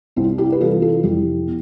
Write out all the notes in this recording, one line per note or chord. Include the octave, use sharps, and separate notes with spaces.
C2 C4 E4
E4 G4
B4
C3 E3 G3 F4 A4
F4 A4
F1 E4 G4
B2